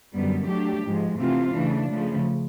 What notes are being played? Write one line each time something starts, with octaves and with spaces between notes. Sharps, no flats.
F#2 D3 G3 B3
F#3 A3 D4 G4
G#2 F3 G#3
C3 E3 A3 C4 F4
C#3 E3 A3 D4
C#3 F3 A3